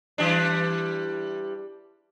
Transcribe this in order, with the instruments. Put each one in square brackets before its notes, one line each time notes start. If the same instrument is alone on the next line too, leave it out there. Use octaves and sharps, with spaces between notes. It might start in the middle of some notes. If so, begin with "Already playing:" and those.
[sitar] E3 G3 D4